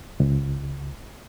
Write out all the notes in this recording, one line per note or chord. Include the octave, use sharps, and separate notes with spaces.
C#2